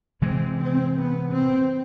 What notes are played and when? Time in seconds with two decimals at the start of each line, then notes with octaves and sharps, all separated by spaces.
0.22 C3 E3 G#3 C4
0.59 C4
0.95 B3
1.32 C4